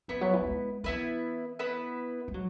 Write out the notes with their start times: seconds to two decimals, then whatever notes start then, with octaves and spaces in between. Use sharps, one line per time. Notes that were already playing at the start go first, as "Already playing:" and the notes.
0.08 E3 B3 E4 B4
0.21 F#3
0.33 E3
0.41 F#3
0.47 G#3
0.84 E3 B3 E4 B4
1.59 B3 E4 B4
2.28 G#3
2.34 F#3